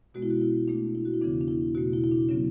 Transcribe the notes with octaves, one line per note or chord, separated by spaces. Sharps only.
B2 G#3 B3 F#4
E4
F#4
E4
B2 A3 D4
E4
F#4
E4
E2 C#3 E3 B3 D4
D4
E4
B2 A3 F#4
E4
E4
D4
C#3 F#3 B3 C#4